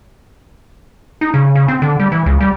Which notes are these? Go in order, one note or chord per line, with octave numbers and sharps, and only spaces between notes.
D#4
C#3
C#3
C4
D3
G3
E3
C#2
G3